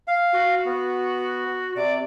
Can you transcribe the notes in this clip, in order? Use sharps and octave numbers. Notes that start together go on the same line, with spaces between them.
F5
F#4
B3
C3 D5